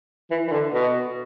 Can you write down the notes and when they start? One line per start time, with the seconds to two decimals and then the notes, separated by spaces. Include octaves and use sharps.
0.30 E3
0.47 E3
0.51 D3
0.74 B2